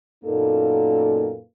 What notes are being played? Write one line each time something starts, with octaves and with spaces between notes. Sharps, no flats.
F#2 A#2 A#3 B3 D#4 A4